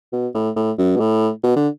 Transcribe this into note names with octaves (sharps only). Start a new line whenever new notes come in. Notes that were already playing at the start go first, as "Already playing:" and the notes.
B2
A2
A2
F#2
B2
A2
B2
D3